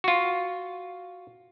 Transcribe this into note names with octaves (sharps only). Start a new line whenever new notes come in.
F4 F#4